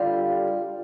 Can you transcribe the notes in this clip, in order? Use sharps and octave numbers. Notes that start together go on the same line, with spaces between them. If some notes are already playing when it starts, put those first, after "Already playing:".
Already playing: D3 G3 F4